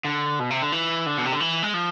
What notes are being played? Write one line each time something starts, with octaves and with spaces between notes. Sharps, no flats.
D3
B2
C3
D3
E3
D3
B2
C3
D3
E3
G#3
F3